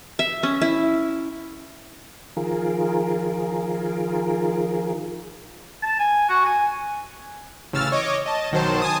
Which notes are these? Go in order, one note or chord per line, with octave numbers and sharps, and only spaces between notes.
E5
C#4
E4
D#3 F3 F4 G#4 A#4
A5
G#5
F#4
G#5
A1 C#3 E6 F6 A6
C#5 D#5 D6
D#5 A5
B1 D#3 F#3 C5 A5
G#5 A5 D#6